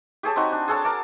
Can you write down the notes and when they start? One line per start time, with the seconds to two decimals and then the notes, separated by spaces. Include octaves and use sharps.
0.23 G4 G#4 C#5 A5
0.36 C4 D#4 F#4 G#5
0.52 D4
0.68 G#4 A4 C#5 A5
0.85 A#4 A5 D6